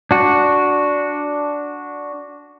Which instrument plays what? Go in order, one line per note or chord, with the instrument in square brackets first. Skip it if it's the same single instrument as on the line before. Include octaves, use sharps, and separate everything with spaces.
[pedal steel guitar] D4 F#4